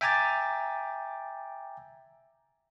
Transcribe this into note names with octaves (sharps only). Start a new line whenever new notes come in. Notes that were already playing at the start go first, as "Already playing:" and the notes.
E5 G5 G#5 A#5 D6 A6